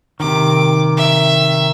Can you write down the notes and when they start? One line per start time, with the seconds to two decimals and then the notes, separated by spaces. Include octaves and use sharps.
0.20 C3 D#3 D6
0.97 E5